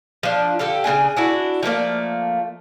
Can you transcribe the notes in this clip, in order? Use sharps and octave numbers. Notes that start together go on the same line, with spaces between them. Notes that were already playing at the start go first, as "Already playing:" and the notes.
F3 D4
D3 G4 A4 F5
C#3 C4 D4 G#5
D4 E4 F#4
F3 A3 A#3 D5